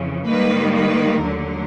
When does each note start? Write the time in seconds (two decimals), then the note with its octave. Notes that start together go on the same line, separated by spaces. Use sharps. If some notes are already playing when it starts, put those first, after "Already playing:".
Already playing: F2 C#3 E3
0.26 G#2 D#3 G3 A#3 B4
0.74 B4
1.22 D#2 D3 F#3 A3 A#4